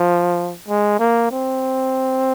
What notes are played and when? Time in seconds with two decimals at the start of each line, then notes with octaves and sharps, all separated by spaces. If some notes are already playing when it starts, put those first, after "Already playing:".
Already playing: F3
0.68 G#3
0.99 A#3
1.31 C4